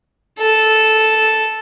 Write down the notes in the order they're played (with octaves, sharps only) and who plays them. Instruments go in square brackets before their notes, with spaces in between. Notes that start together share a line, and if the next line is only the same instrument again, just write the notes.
[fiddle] A4